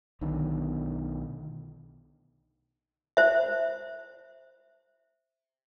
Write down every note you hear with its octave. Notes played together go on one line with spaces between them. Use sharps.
B1 B2 D3 D#3
C5 E5